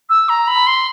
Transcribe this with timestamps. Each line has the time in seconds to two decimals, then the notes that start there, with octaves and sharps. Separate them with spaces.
0.10 E6
0.29 A#5
0.47 B5
0.67 C6